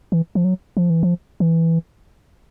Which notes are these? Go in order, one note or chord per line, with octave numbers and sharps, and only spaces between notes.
E3
F3
F#3
F3
E3
F3
E3